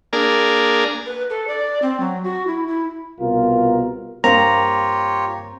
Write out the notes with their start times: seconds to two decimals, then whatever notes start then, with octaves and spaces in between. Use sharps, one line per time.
0.13 A#3 D4 G#4 A#4
1.06 B4
1.30 A4
1.47 D5
1.82 C4
2.00 F#3
2.24 F#4
2.47 E4
2.67 E4
3.21 C2 B2 F4 A#4
4.24 G2 A#3 C4 F4 G4 C#5 A#5